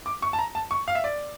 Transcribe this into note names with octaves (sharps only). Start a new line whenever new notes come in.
D6
C#6
A5
A#5
A5
C#6
F5
E5
D5